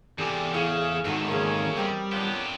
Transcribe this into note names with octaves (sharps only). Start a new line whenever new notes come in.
E2 G#2 C3 G4 A4 D5 G#5
A2 C#3 G#4 F5 F6
E2 G#2 D#3 A3 F#4
C#3 A#3 C#4 A4
G3 C4 A#4 D#5
C#2 A2 F#3 B3 D4 F4 G4